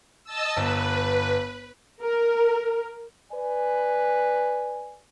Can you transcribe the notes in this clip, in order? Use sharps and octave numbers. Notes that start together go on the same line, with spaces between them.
D#5 A5 E6
G1 B4
A#4
B4 D5 G#5